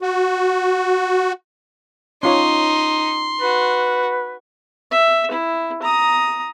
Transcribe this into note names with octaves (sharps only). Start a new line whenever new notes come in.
F#4
C#4 D#4 F4 C#5 C6
F#4 B4
E5
E4
A#5 D#6